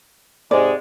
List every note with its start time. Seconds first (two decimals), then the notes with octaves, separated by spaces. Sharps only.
0.51 G#2 C3 G#3 D5